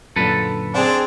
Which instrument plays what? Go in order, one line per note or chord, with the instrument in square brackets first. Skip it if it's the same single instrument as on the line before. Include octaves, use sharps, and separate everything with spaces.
[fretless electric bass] F#2 A#2 D3 [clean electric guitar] A4 B4
[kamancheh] C4 G#4 [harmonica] D4